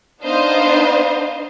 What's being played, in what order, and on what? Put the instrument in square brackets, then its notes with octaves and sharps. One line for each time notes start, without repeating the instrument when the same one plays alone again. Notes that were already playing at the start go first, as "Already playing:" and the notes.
[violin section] B3 D4 D#4 C5 D#5 F5